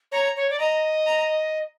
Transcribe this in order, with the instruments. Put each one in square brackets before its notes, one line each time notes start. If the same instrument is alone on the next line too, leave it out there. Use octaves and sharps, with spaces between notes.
[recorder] C#5 [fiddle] A#5
[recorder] C#5
D5
[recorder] D#5 [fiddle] A#5
[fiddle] A#5